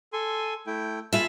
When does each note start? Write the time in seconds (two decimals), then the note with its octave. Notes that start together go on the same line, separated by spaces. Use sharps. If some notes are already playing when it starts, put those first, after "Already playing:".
0.13 A4 G#5 C6
0.67 A3 E4 G5
1.13 F4 E5 G#5 A5 B5